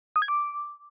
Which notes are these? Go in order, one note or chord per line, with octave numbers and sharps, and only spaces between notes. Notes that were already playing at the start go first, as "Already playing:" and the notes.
D#6
G#6
D6